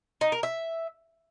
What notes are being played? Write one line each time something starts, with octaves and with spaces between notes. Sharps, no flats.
D#4
A#4
E5